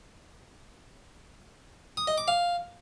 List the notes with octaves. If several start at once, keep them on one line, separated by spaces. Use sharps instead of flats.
D#6
D#5
D6
F5